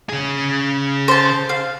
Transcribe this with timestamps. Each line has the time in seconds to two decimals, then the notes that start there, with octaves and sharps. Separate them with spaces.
0.09 C#3 G#4
1.08 C5 A5
1.49 F5